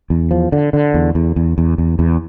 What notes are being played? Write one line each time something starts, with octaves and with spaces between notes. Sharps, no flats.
E2
F3
D3
D3
E2
E2
E2
E2
E2
E2